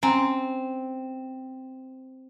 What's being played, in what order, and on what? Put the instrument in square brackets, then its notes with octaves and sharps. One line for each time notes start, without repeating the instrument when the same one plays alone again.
[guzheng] C4 [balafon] C#4 G#5 A#5